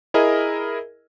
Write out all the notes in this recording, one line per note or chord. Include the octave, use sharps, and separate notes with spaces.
E4 G#4 A#4 D#5